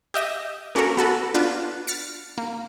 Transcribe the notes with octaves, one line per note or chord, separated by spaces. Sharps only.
G4 D#5 E5 A#6
A#3 C#4 D4 F#4 A4 A#4
B3 F#4 A4 B4
B3 D4 F4 B4
F6 A6 B6 C#7
A#3